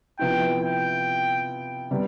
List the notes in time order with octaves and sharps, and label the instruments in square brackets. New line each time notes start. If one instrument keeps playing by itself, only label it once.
[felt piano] C3 F3 B3 E4 [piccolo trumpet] G5
[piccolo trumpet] G5
[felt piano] C3 G3 B3